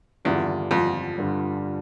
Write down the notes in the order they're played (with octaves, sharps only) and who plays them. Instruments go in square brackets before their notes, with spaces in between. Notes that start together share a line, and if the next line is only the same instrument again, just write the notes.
[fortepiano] E2 [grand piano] G2 D3 G3 D4 F4
[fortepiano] F2
[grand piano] G2 D3 G3 D4 F4